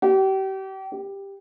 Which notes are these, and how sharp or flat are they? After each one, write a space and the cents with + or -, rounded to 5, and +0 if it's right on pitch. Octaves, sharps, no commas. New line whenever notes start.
G4 -35
G4 +10